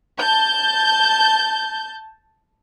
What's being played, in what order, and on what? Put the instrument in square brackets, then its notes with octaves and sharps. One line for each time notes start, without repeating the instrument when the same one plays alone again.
[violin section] A5 G6